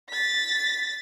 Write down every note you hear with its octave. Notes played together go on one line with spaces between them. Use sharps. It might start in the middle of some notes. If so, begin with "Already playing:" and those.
A6 B6